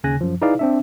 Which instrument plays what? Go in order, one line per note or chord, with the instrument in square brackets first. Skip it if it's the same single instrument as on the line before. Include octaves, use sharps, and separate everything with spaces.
[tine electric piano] D#2 C#3 G#5 F#6 A#6
F#2 F3
D#4 E4 G#4 B4 D5 F5
C4 D4 E5